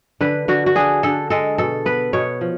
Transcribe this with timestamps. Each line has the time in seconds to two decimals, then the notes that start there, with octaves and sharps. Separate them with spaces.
0.21 D3 B4
0.48 D3 F#4
0.66 F#4
0.76 D4 G#4
1.03 D3 A4
1.30 G#3 A4
1.58 B2 A4
1.86 B3 B4
2.13 B2 C#5
2.41 F3